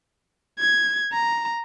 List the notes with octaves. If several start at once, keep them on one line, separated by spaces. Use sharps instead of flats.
G#6
A#5